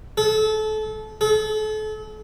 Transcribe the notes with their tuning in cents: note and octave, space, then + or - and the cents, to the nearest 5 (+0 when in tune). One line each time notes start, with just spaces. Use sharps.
A4 -30
A4 -40